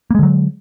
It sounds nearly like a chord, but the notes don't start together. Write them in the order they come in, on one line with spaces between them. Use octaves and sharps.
A#3 G#3 D3 F#3